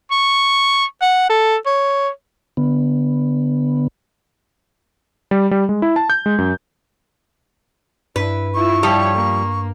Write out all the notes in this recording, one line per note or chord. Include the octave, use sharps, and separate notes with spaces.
C#6
F#5
A4
C#5
D3 B3
G3
G3
G#3
E4
A5
G6
G#3
F#2
G2 E4 B4
E4 F4 C#6
F3 G3 E4 C#5
A#3